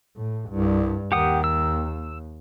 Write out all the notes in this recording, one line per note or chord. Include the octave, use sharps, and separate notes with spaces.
A2
C2 G2
D#2 D#3 G4 F#5 D#6
E6